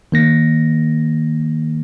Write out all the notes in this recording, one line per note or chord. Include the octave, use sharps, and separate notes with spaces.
D#3 A#3 A#6